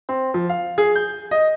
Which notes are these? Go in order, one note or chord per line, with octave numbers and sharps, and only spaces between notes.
C4
F3
F5
G#4
G6
D#5